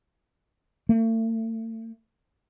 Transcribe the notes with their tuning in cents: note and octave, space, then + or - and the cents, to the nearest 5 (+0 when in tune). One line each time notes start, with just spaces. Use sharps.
A3 +40